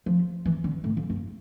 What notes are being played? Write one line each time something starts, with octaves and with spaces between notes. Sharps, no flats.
F3
E3
D3
A2
F2
G2